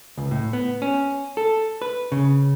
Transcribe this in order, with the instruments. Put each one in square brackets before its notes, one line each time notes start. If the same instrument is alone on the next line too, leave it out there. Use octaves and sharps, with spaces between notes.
[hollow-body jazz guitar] C#2
A2
B3
C#4
A4
B4
C#3